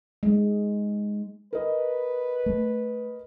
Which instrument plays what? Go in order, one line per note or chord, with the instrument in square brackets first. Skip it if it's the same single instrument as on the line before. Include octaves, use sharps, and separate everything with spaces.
[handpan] G#3
[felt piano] A#4 D#5 [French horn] B4
[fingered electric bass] A3